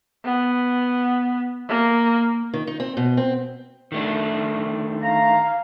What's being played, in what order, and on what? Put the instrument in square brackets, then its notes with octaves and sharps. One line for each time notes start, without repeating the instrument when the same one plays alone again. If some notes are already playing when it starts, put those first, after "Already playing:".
[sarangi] B3
A#3
[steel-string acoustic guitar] D#3
D#4
C4
B2
C4
[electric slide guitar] D#3 A3 D4
[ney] F5 [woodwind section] A#5